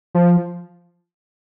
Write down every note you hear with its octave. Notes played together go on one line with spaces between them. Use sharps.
F3